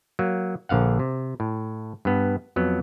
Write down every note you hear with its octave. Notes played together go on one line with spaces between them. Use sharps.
F#3 A#3
A#1 D3 F5 F#5
C3
A2
G2 B3
F2 F#3 B3